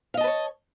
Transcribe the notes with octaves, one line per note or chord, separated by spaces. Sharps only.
B4 C#5 D#5 F5 A5